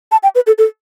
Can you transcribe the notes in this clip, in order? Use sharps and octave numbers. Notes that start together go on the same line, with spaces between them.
A5
G5
B4
A4
A4